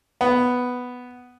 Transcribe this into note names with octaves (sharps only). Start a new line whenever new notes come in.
B3